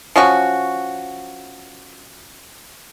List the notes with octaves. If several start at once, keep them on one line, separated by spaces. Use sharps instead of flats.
F3 C#4 F#4